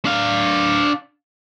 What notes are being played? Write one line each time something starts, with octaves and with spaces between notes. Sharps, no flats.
D4 F5